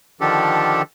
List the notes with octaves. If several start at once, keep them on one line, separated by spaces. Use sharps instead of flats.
D3 D#3 F3 D4 G4 A4